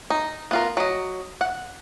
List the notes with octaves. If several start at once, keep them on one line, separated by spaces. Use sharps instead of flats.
D#4
B3 F4 A#4
F#3 D#5
F#5